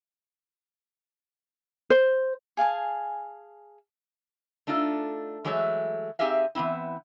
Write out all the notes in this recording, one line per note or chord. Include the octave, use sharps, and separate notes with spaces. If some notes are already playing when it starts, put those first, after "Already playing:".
C5
G#4 F5 G#5 A5
A3 D4 D#4 F4 A4
E3 F#3 G#3 A3 C#5 E5
C4 D#4 G4 G#4 E5 F5
E3 F3 B3 C4 E4